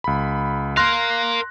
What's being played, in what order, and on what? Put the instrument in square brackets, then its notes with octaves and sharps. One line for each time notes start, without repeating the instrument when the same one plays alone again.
[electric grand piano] C#2 B5
[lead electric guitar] A#4 F5 [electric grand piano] C6 F#6 A#6